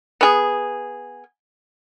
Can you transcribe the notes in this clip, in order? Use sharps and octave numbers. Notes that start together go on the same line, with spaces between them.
B3 G#4